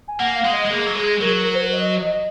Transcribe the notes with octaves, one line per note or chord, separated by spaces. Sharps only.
G#5
A#3 F#5
F5
G#3
D#5
G#3
A#3 G#4
F#3
G#3 G#4
F#3 A#4
A#4
A#4
C5
D#5
D#5